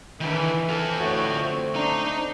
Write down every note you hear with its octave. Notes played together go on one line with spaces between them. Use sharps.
D#3 E3 D4
F4 A4
A2 D3 A3 F#4
A3 C4
D4 D#4 A#5